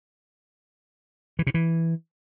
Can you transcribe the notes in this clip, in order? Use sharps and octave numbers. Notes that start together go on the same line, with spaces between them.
E3
C3
E3